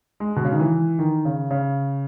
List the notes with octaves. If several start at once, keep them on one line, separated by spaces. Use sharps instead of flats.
G#3
B2
C#3
D#3
E3
D#3
C#3
C#3